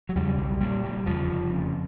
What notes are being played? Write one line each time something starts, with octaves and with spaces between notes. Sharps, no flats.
F#3
E2 C#3 G3
B1 G3
A#2 G3
F#1 G3
E2 C#3 F3
F1
F2 C#3